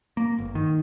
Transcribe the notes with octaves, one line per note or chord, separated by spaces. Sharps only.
A#3
G1
D#3